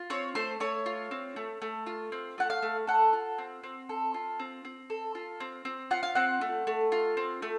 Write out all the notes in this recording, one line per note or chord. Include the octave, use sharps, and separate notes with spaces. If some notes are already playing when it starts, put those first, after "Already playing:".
Already playing: F4
C4 C#5
A3 C5
A3 C#5
F4
C4
A3
A3
F4
C4
A3 F#5
F5
A3
A4 F#5
F4
C4
C4
A4
F4
C4
C4
A4
F4
C4
C4
F4 F#5
F5
C4 F#5
A3
A3
F4
C4
A3